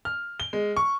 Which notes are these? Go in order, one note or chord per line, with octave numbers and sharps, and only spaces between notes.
F6
G7
G#3
C#6